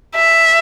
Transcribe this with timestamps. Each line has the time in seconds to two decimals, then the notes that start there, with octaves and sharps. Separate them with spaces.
0.16 E5